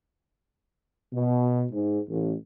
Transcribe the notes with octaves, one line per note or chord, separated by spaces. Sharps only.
B2
G#2
A1